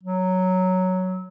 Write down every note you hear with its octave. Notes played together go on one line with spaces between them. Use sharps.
F#3